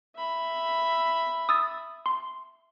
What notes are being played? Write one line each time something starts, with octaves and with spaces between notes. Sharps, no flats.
E5 B5
D#6 E6 A6
C6